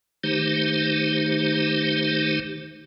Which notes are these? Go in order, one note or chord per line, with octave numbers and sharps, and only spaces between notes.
D#3 A3 D#4 G4 C5